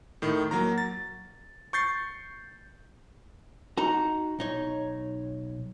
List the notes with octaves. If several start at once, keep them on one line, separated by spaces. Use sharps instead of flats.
A2 D#3
F#3 A#3 A#5
A6
C#6 G6 A6 C7
D#4 F#4 A#5
B1 D#4 C#5